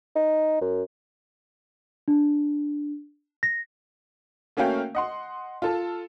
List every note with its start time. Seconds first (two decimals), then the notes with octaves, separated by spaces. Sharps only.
0.16 D#4
0.62 F#2
2.08 D4
3.43 A#6
4.57 A3 A#3 C#4 F#4 F5 G5
4.95 D#5 F#5 C6
5.62 F4 A4 A5